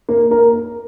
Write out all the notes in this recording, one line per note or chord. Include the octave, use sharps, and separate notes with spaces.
A#3 A#4
A#3 A#4